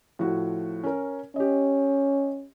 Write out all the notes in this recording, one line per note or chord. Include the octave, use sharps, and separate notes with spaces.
A2 F3 F#4
C#4 A#4
C#4 G4 D#5